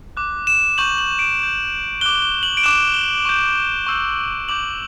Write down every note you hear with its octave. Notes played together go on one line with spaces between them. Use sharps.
D6 F#6
E7
C#6 G6 F#7
F#7
D7
D6 G6
D6 F#6 G7
G7
F#7
D7
D6 F#6 E7
G7
C#6 G6
C#6 E6 G6
D6 G6 F#7